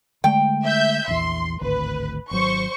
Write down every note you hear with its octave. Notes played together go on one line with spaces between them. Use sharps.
D3 G#3 A3 G5
E5 G6
A#1 E2 C6
G#1 D2 A2 B4
G#1 F#3 C5 C#6